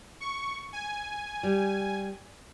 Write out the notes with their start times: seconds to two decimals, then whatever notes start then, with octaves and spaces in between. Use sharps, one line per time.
0.20 C#6
0.73 G#5
1.43 G3